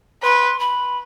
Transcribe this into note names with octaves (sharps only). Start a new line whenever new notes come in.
B4 C6
B5